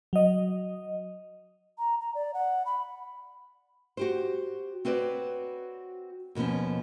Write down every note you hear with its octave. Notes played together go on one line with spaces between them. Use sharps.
F#3 D#5
A#5
A#5
D5
F#5
B5
F#4 G4 C5
C4 F#4 B4 C#5 D5
D#2 B2 D3 F3 C#4